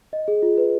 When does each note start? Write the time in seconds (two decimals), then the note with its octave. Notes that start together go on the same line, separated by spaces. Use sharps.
0.13 D#5
0.28 G#4
0.43 F4
0.58 B4